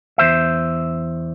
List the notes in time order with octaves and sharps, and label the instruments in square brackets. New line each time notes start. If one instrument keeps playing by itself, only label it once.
[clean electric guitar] E2 C5 E5